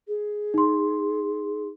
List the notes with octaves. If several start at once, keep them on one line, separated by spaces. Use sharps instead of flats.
G#4
D#4 C6